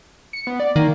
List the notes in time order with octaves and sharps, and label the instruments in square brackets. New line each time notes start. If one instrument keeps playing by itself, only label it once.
[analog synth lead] C#7
B3
D5
[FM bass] D#3 [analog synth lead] A#3